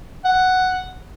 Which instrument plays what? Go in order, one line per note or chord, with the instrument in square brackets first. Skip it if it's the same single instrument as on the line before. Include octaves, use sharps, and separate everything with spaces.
[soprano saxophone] F#5